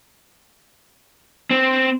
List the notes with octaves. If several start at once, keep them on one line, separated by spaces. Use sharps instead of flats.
C4